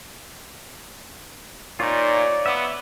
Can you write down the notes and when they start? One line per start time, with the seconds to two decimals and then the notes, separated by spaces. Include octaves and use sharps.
1.80 A#2 D#4 F4 C#5 D5
2.46 B3 E5 D6